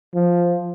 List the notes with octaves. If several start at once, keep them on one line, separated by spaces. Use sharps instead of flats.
F3